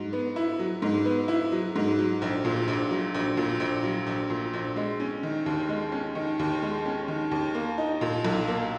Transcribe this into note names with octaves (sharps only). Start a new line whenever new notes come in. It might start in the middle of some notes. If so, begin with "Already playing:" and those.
Already playing: G#2 F#3
B3
E4
F#3
G#2
B3
E4
F#3
G#2
F#3
A#1
A#2
A#1
F#3
A#1
A#2
A#1
F#3
A#1
A#2
A#1
G#3
C#4
D#3
D#2
G#3
C#4
D#3
D#2
G#3
C#4
D#3
D#2
A#3
D#4
A#2
B1
A#3